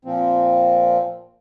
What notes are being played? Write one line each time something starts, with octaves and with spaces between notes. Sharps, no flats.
A#2 F3 C4